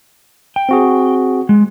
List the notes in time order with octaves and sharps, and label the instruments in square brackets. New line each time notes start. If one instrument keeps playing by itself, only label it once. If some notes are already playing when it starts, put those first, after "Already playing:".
[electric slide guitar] G5
[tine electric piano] C4 F#4 G#4
[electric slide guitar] G#3